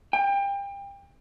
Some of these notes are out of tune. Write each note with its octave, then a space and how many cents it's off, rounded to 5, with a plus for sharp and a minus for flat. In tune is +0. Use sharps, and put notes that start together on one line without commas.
G5 +30